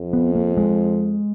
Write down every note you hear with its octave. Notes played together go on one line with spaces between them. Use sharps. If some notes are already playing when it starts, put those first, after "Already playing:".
Already playing: F2
B3
A#3
G#3